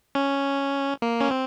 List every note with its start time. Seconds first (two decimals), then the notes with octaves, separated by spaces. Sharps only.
0.15 C#4
1.02 A#3
1.21 C#4
1.31 C4